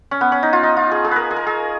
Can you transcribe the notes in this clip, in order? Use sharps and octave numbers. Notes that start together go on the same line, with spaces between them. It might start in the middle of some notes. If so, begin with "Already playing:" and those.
C#4
B3
C#4
D#4
F4
D#4
F4
G#4
G#4
A#4 B4
G#4
A#4
G#4